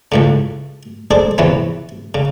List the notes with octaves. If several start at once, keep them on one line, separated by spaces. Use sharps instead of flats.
C#2 A2 C#3
G#4 A4 C5 D5
E2 C3 E3 B3 C#4
C#3